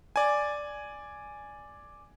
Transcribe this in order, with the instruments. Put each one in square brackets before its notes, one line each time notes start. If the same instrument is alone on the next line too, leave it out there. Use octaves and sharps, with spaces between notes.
[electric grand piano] D5 G#5